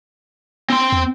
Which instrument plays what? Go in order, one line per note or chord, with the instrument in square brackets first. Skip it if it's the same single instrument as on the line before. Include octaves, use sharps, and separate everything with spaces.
[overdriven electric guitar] C4 C6
[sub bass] E2